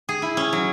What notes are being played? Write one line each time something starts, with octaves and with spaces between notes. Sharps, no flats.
G#4
E4
C#4
F#3